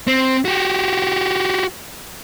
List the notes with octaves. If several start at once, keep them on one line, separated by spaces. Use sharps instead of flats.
C4
F#4 G4